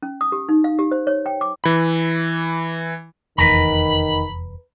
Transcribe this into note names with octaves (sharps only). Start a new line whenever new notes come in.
C#4
D#6
G4
D#4
F5
G4
C5
C#5
G5
D6
E3 B5
F1 E2 D#3 B4 A#5 B5